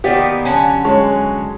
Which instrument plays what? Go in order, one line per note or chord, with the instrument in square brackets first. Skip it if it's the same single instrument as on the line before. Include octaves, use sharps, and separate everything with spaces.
[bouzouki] D#3 A#3 B3 [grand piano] G4 D5
[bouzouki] D3 F#3 C#4
[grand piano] G#3 C#5 A5